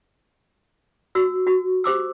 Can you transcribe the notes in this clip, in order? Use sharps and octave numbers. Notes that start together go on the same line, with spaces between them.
F#4 E6
F#4
G4 C5 D6 E6